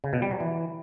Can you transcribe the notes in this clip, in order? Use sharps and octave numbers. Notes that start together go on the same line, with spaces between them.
C#3
B2
G3
F#3
E3